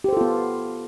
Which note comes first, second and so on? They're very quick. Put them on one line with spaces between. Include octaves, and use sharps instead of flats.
G4 C5 A4 F4 B3